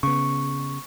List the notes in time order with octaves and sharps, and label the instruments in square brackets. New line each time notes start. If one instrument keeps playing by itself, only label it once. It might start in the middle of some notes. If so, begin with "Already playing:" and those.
[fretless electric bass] C#3 B3 [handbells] C#6